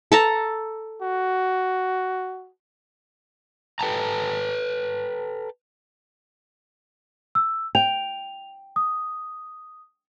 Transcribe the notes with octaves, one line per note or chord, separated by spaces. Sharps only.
A4 A5 A#5
F#4
A4 B4 G5 A5 A#5
E6
G5 F7
D#6